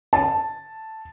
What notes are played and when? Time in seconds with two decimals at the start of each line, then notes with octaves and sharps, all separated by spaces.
0.13 A5